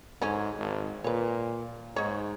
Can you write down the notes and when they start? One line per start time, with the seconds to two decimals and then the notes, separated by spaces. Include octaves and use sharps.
0.22 G#2 D3 F#3 C#4
0.58 G#1
1.04 A#2 B4 C#5
1.96 G#2 D#4 C#5